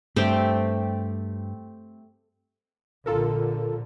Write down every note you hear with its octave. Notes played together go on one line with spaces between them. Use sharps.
G2 A3 C4 G4
A#1 D3 F4 A4 A#4